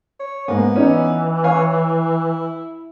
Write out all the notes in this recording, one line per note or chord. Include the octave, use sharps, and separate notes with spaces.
C#5
G#2 A#3 B3
E3 C#4 D#4
C#5 F5 G#5
E4